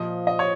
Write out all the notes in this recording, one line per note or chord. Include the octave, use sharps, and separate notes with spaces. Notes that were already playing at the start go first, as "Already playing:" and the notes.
Already playing: A#2 F3 D#5
D#5
C#5